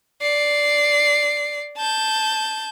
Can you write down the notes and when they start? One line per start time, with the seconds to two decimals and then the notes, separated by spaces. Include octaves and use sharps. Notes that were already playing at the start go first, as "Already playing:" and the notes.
0.22 D5 C7
1.77 A5 G6